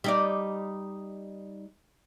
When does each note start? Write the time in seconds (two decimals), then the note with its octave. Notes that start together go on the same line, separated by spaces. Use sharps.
0.04 G3 D#4 D5